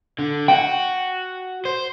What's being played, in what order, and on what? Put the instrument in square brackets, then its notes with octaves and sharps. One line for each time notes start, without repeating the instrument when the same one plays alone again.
[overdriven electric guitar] D3
[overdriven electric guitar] F#4 [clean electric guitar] G5
[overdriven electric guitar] C5